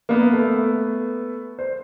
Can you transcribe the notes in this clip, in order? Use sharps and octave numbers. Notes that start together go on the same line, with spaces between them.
A#3 B3
A3 B3
C5